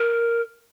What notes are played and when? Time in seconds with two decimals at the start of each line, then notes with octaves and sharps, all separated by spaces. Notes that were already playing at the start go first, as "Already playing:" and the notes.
Already playing: A#4